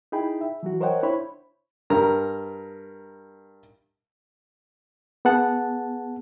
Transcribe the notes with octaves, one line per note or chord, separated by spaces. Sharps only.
D#4 E4 G#4 G5 B5
E5
E3 F#3 F#4
A#4 C5 C#5 D#5 F#5 G5
D4 E4 C5 C#5 B5
G2 A#4 A#5
B3 G#4 F#5 A5